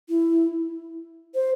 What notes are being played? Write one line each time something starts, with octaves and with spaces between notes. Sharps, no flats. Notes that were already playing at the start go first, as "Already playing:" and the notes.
E4
C5